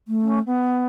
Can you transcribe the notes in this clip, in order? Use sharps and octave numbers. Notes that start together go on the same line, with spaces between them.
A3
C#4
B3